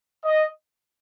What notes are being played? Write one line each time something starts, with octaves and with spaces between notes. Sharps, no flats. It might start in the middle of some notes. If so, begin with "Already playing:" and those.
D#5